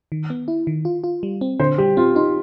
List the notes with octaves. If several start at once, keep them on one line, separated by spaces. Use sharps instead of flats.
D#3
B3
E4
D#3
F4
F4
G3
C4
D3 C5
G3 G4
C4 F4
D#4 F4